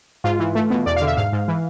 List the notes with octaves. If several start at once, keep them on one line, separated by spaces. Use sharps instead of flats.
G#2 F4
E3
A3
B2
E2 D5
F5
D3
E5
G#2 F5
G#2
E3